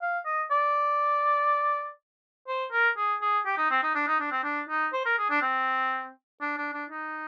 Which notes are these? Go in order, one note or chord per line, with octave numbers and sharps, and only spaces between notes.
F5
D#5
D5
C5
A#4
G#4
G#4
G4
D#4
C4
D#4
D4
D#4
D4
C4
D4
D#4
C5
A#4
G#4
D4
C4
D4
D4
D4
D#4